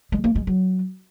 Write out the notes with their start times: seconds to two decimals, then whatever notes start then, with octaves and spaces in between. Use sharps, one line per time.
0.12 G#3
0.24 A#3
0.36 G#3
0.47 F#3